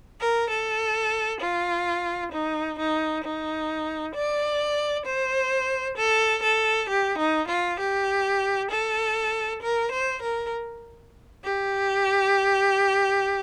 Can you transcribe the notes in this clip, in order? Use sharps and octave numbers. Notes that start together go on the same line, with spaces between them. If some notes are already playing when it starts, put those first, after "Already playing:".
A#4
A4
F4
D#4
D#4
D#4
D5
C5
A4
A4
G4
D#4
F4
G4
A4
A#4
C5
A#4
G4